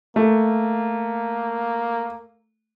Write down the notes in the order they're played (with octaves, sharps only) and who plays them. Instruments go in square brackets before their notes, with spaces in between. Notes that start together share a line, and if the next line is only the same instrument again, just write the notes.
[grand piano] A3 [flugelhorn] A#3